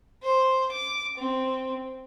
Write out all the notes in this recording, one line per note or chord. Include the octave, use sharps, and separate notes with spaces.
C5
D6
C4